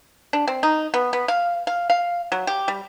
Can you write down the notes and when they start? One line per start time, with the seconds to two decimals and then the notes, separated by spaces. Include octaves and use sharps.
0.33 D4
0.48 C4
0.63 D#4
0.94 B3
1.13 B3
1.28 F5
1.67 F5
1.90 F5
2.32 F#3
2.47 G4
2.68 G3